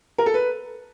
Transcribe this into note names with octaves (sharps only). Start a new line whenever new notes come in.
A#4
A4
B4